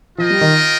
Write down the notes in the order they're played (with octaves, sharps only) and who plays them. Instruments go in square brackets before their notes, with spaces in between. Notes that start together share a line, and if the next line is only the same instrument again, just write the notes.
[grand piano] F3 [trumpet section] F4 A#4 D#5 G5
[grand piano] G3
D#3